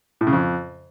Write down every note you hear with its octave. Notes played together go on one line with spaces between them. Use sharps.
A2
C#3
F2